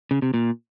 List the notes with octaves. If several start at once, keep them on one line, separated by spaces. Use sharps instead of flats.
C#3
C3
A#2